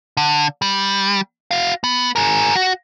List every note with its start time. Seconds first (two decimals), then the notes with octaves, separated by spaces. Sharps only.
0.17 D3
0.62 G3
1.51 F#4 F5
1.84 B3
2.16 G#4 A#4
2.55 F#4